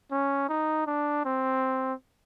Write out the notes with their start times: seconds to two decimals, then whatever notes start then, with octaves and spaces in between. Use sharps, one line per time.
0.11 C#4
0.49 D#4
0.87 D4
1.25 C4